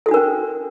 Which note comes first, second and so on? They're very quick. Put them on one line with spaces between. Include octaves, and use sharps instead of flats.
A4 F#4 D4 A#4 C#4